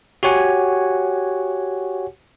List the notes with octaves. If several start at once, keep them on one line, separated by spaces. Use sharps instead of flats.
F#4 G4 C#5 F#5 G#5